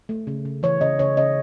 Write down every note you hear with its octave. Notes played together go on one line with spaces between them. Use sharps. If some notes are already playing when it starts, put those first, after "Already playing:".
A3
C#3
C#3
E3 C#5
C#3 D#5
C#3 C#5
C#3 D#5